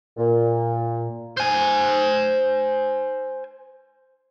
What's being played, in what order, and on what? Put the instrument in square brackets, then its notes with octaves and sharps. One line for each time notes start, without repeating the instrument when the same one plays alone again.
[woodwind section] A#2
[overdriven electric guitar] C5 G#5